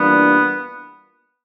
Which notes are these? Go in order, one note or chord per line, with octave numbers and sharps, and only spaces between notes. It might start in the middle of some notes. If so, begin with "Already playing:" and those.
Already playing: E3 G3 A#3 B3 D4 F4